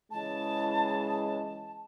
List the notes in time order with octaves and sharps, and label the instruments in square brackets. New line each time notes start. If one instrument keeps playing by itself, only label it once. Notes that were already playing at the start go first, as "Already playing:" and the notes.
[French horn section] C#3 E3 G#3 [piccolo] A5